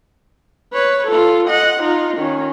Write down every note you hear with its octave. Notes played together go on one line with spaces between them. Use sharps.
B4 C#5
F4 A4
D#5 F#5
D#4 F4
D#3 C#4